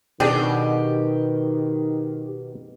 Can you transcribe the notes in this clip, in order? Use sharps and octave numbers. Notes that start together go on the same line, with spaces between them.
B2 D#3 C4 D4 G4 G#4